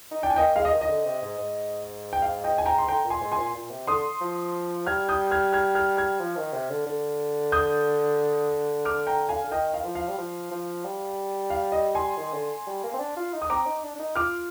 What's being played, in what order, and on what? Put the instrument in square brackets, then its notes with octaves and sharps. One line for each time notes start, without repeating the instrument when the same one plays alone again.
[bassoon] D#4
[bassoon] D4 [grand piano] G5
[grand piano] G#5
[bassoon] A#3 [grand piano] D#5 G5
[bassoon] G#3 [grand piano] F5
[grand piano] D#5
[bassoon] D#3
[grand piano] D#5
[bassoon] D3
C3
G#2
G#2
[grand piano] G5
F5
D#5 G5
G#5
G5 A#5
C6
[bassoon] D3 [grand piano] G5 A#5
[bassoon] A#2
[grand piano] G#5 C6
[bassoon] G#2
[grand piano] G#5 C6
[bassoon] A#2
A#2
C3
[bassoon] D3 [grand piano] C6 D#6
[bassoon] F3
[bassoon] G3 [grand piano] F6 G#6
[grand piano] D#6 G6
F6 G#6
F6 G#6
F6 G#6
F6 G#6
[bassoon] F3
D#3
C3
D3
D3
[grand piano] D#6 G6
D6 F6
G5 A#5
F5 G#5
[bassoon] D3
[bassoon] D#3 [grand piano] D#5 G5
[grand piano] F5
[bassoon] F3
[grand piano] F5
[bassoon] G3
F3
F3
G3
[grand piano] F5
D#5
G#5 C6
[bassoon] D#3
D3
G3
A#3
C4
D4
F4
D#4
[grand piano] D#6
[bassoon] C4 [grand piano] A#5 D6
[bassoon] D#4
D4
D4
D#4
[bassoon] F4 [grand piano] D6 F6